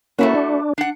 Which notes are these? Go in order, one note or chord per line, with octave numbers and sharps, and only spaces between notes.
A3 A#3 C#4 E4 F#4
D4
D4 F#5